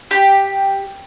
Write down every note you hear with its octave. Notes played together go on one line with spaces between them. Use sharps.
G4